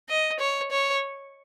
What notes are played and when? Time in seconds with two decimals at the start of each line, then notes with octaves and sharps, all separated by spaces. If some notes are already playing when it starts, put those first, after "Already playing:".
0.09 D#5
0.39 C#5
0.71 C#5